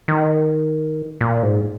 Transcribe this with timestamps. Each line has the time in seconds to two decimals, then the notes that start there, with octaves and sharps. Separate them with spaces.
0.08 D#3
1.21 A#2
1.43 G#2